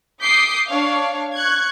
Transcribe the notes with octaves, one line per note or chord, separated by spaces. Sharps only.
D6 D#6 G6 B6 C7
D4 C#5 F5
C#6 F#6 G#6